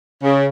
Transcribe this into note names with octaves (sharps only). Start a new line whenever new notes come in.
C#3